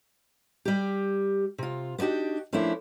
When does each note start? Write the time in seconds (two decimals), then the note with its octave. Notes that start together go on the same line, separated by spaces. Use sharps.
0.65 G3 G4
1.58 C3 F4
1.98 B3 D4 D#4 F#4 G4
2.53 F3 A3 A#3 C#4 D4 E4